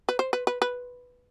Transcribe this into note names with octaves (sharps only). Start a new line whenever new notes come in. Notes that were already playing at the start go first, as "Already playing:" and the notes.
B4
C5
B4
B4
B4